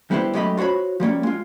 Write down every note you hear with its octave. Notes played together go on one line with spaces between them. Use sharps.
G3 B3 E4 G4 C5
F#2 G#3 A3 G4 D#5 B5
F4 F#4 C5 C#5 B5
F3 G3 A#3 C#4
G#3 F4